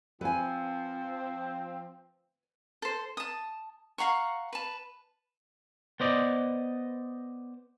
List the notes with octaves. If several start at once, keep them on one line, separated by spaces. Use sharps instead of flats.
F3 C4 B4 G#5
A4 C5
A5 D#6
F5 F#5 A#5 C#6
B4 A5
B3 C5 D5 D#5